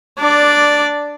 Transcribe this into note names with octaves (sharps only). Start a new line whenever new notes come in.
D4 D5